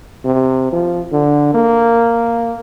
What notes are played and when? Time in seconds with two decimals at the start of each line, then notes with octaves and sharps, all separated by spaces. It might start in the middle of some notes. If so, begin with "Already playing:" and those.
0.25 C3
0.72 F3
1.12 D3
1.54 A#3